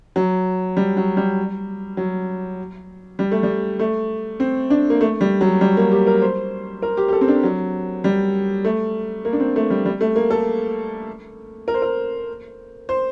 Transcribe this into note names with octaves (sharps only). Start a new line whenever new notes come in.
F#3
G3
F#3
G3
F#3
G3
A3
G3
A3
C4
D4
A#3
A3
G3
F#3
G3
A#3
G4
A#4
C5
A#4
G4
G4
A4
C4
D4
F#3
G3
A3
A#3
D4
C4
A3
G3
G3
A3
A#3
A4
A#4
C5
A#4
C5